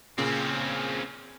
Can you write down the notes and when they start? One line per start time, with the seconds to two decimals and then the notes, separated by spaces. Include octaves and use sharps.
0.18 A#2 C#3 C4 C#4